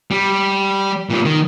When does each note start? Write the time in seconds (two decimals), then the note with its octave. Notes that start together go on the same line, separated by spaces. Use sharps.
0.11 G3
1.10 A#2 G3
1.25 D#3